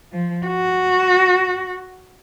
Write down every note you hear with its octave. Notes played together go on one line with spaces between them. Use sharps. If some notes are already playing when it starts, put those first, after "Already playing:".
F3
F#4